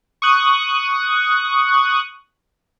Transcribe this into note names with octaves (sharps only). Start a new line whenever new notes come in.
C#6 D#6 F#6